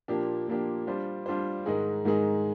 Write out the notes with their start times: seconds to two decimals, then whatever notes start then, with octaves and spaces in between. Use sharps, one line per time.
0.08 A#2 F3 A#3 D4 G4
0.48 A#2 F3 A#3 D4 G4
0.87 G3 D4 F4 C5
1.26 G3 D4 F4 C5
1.66 G#2 D#3 G#3 D#4 G#4
2.05 G#2 D#3 G#3 D#4 G#4